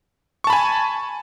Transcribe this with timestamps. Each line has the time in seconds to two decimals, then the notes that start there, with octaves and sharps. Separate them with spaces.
0.44 C#6
0.47 A5
0.50 B5
0.53 G#5